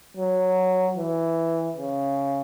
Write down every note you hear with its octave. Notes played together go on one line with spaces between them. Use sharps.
F#3
E3
C#3